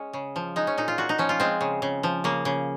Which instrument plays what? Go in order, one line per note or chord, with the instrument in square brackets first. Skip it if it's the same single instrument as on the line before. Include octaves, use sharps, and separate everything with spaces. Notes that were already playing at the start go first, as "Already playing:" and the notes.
Already playing: [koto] G#3 C#4
C#3
F3
G#3 D#4
C#4
A#2 D#4
F4
A#2 F#4
D#4
F3 C#4
F4
G#3 C4
C#3
C#3
F3
C#3 A#3
C#3